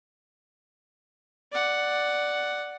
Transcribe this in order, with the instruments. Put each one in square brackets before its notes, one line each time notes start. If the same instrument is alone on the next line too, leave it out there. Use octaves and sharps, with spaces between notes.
[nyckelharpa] D5 F#5